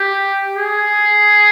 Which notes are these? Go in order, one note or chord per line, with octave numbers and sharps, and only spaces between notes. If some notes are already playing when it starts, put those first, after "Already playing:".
Already playing: G4
G#4